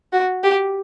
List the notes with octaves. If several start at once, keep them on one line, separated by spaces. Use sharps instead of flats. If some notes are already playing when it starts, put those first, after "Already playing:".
F#4
G4